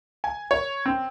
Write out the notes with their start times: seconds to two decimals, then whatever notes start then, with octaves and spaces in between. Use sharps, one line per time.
0.24 G#5
0.51 C#5
0.86 C4